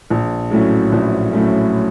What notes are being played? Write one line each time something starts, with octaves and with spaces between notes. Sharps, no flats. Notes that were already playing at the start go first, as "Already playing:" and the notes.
A#1
A2 F#3 A3 C#4
A#1
A2 F#3 A3 C#4